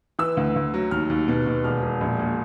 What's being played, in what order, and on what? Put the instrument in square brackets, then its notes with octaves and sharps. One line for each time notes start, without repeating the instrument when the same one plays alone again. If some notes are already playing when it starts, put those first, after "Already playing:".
[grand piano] E3 E6
D2
D2
F#3
D#2 F6
D#2
B2
B2
E1 F6
E1
A#1
A#2